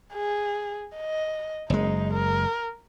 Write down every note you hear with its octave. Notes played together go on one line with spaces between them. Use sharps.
G#4
D#5
F#1 G#3 D#4
A#4